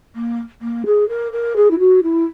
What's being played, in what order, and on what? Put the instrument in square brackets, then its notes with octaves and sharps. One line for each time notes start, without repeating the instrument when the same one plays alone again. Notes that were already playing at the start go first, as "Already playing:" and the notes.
[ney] A#3
A#3
G#4
A#4
A#4
G#4
E4
F#4
E4